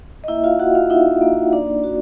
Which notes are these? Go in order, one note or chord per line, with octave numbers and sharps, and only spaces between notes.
D#5
A#3 E4 E5
F4 F5
F#4 F#5
F4 F5
D#4 E4 E5
A#3
A#3 D4 D5
F#4